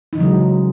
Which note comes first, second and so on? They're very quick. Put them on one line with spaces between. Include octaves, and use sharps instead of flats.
D#4 E3 C#3 F#3 G#3